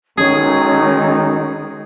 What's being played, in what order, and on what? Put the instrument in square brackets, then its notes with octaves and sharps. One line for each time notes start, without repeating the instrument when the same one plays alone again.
[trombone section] B1 D#4 [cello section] D#3 G#3 [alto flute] C#4 [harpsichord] G#4